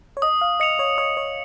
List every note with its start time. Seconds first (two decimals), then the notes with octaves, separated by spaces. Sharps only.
0.17 C#5
0.22 D#5 D#6
0.41 F5
0.60 D#5 C#7 F7
0.79 C#5
0.98 C#5 D#6
1.17 C#5